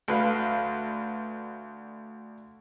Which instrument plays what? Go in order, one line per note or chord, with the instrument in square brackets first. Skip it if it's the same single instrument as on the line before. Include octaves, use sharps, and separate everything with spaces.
[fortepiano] D2 B4 F5